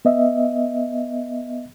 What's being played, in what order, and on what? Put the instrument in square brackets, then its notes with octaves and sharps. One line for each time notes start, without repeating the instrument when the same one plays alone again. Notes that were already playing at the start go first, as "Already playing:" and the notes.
[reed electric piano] B3 D#5 E5